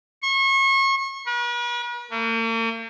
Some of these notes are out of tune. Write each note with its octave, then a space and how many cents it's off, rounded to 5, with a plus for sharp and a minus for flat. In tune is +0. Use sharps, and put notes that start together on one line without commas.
C#6 -35
B4 -45
A#3 -45